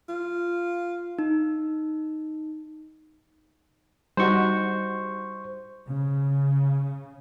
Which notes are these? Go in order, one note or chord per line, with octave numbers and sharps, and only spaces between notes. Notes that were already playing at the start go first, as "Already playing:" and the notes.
F4
D#4
G3 D#4 F#4 C5 C#6
C#3